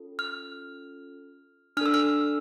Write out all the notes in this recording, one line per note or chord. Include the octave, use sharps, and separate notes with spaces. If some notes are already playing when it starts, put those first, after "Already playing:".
Already playing: C#4 F4 A4
F6
D4 A4 E6 F6
F6